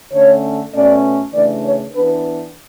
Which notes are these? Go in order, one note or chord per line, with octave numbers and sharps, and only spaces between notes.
D3 A3 C#4 C#5
B2 A3 C#4 D5
C#3 E3 A3 D4 D5
C#5
E3 B3 D4 B4